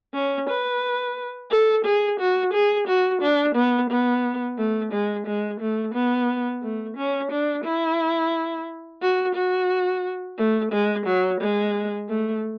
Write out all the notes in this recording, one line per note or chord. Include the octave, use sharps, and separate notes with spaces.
C#4
B4
A4
G#4
F#4
G#4
F#4
D4
B3
B3
A3
G#3
G#3
A3
B3
A3
C#4
D4
E4
F#4
F#4
A3
G#3
F#3
G#3
A3